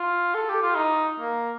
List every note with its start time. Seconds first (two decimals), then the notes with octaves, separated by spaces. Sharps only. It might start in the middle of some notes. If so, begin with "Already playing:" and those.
Already playing: F4
0.34 A4
0.49 G4
0.62 F4
0.75 D#4
1.19 A#3